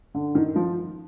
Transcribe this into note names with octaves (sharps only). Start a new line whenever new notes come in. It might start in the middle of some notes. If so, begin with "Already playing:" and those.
D3
D#3
F3